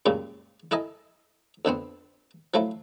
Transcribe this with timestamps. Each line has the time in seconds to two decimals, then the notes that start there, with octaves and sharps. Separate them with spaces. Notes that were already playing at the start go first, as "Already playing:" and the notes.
0.06 C#2 F#2 A#2 C#3 G3
0.71 E4 A4 A#4 D#5 G#5
1.65 F2 D3 B3 C4
2.54 F3 F#3 A3 E4